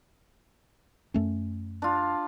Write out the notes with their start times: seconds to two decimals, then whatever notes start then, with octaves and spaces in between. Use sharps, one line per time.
1.14 F#2 A3 C#4
1.82 D4 F4